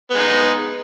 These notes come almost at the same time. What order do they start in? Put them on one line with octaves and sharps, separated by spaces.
B3 G#3 D#4